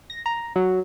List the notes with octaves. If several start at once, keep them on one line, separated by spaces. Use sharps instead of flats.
A#6
A#5
F#3